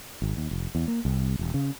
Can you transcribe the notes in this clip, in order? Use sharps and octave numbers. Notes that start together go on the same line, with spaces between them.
G#1
D#2
F1
E2
A#3
C2
E1
C#3